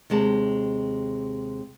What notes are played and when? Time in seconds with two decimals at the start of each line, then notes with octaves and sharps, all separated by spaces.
0.10 D#2 C3 G#3 A5